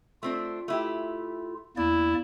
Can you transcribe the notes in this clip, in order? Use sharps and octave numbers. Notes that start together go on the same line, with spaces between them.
A3 C4 D4 F4
A3 E4 G4
E2 A#3 D4 E4 D5